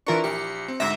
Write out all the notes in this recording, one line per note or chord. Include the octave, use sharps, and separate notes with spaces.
E3 D4 F4 A#4 C#6
A#1 G4 C#7
C4
D2 G#2 E5 A#6